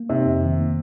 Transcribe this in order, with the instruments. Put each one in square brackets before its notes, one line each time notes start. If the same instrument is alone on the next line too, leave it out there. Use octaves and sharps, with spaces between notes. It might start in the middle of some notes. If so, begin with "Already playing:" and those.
Already playing: [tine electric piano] A#3
[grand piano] C3 [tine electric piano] D#4
[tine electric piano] F2
D#3
A#3